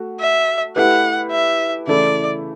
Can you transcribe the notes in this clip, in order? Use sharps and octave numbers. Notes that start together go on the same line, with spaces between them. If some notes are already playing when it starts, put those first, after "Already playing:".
Already playing: A3 F#4
E5
A3 E4 G4 B4 F#5
E5
C#3 E3 A3 E4 D5